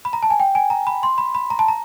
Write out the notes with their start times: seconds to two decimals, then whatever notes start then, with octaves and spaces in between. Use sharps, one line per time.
0.05 B5
0.13 A#5
0.23 A5
0.30 G#5
0.40 G5
0.55 G#5
0.70 A#5
0.87 B5
1.03 C6
1.18 B5
1.35 B5
1.50 A#5
1.59 A5
1.68 A#5